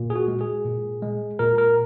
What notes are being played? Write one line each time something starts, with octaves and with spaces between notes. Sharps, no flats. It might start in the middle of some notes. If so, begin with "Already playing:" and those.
Already playing: A#2
G#4
F#4
G#3
G#4
A#2
G#3
A#2 A#4
A#4